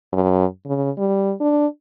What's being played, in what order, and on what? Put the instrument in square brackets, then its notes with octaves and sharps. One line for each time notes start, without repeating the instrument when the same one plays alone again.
[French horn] F#2
C#3
G3
D4